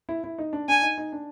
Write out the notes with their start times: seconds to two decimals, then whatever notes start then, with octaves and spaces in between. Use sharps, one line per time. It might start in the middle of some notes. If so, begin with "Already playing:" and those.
0.09 E4
0.24 E4
0.38 D#4
0.53 D4
0.68 D4 G#5
0.82 D#4
0.98 D#4
1.12 D4